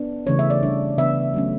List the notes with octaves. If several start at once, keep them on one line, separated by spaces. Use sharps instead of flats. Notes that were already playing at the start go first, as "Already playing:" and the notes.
Already playing: B3 D4
C#3 E3 A3 C#4 C#5
E5
D5
E3 G3 D4
C#3 E3 B3 D4 E5
F#3 A3 C#4